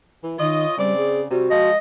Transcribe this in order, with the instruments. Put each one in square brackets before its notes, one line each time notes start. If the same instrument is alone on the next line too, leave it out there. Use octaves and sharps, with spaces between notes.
[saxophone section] E3
[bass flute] D#3 [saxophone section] F4 C#5 D#5
[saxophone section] C#3 C4 D5 [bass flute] G3
[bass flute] G#4
[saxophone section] C3 G3 [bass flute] F#4
[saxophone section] F3 G#3 [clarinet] D#5